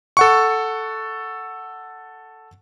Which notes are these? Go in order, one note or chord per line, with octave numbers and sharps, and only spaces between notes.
A4 F#5 C#6